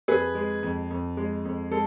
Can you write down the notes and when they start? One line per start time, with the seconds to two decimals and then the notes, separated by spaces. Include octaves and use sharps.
0.08 F2 G#4 B4
0.35 G#3
0.63 F2
0.90 F2
1.17 G#3
1.45 F2
1.71 G#3 A4